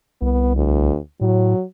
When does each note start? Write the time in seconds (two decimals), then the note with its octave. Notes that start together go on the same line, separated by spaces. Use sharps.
0.22 C2 B3
0.55 D2
1.21 A2 F#3